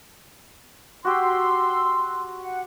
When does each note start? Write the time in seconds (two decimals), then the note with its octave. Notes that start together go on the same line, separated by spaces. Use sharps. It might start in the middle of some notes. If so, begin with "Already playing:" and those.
1.05 F#4 G4 C6 E6
2.41 F#5